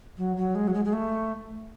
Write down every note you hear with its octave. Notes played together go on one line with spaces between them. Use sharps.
F#3
F#3
G#3
F#3
G#3
G#3
A3